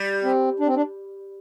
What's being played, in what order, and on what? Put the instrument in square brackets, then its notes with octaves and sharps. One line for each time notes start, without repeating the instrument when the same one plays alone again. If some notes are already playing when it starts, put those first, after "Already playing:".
Already playing: [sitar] G3
[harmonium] C4
D4
C4
D4